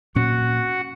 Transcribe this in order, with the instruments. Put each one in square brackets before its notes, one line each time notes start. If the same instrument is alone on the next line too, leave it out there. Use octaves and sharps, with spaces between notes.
[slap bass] A#2 F#3 C#4 [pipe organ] F#4 F#5